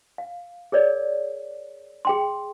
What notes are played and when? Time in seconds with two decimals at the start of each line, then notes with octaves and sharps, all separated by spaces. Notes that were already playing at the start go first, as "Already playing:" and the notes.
0.18 F5
0.72 G#4 A#4 C#5 D5
2.05 G#4 G5 C6